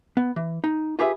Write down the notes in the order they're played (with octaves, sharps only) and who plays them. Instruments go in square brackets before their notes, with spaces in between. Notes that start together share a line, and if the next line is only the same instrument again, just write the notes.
[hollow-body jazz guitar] B3
E3
D#4
F4 G4 G#4 B4 C#5 E5